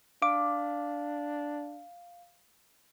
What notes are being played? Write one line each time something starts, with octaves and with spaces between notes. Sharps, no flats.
D4 F5 D6